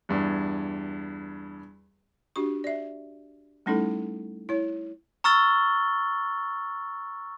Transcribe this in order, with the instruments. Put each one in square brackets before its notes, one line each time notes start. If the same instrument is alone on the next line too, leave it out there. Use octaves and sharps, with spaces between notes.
[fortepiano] E2 G2
[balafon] D4 F#4 G4 C#6
D5 E5
G3 A3 C#4 D#4 E4 A4
E4 C#5
[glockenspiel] A#5 C#6 E6 F6 A6 G7